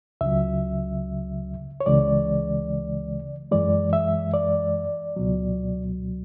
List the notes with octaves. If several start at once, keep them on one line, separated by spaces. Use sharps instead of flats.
C#2 C#3 F#3 E5
C#5
C#2 C#3 E3 G#3 D5
F#2 E3 G#3 D5
E5
D5
C#2 B2 F#3